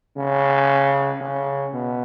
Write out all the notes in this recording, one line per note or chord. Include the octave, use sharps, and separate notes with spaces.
C#3
C#3
B2